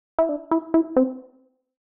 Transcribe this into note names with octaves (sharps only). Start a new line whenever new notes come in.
E4
D4
E4
E4
C4